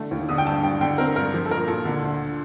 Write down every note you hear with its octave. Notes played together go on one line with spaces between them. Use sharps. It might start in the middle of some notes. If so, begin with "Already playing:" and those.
Already playing: D3 A3
D#2
D3 D#6
G5
G2 A5
G2 G5
D3 G5
C4 A#4
G2 A#4
F3
A4
A#2 A#4
A#2 A4
D3
D2